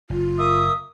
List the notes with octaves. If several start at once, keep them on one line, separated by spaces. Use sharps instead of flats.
F#1 F4
A#3 E5 D#6